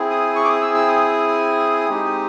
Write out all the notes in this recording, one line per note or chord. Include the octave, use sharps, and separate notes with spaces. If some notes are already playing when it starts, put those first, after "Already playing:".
Already playing: C4 E4 G#4
D#6
C#6
D6
D#6
E6
E6
D#6
G#3 C4 D#4 G4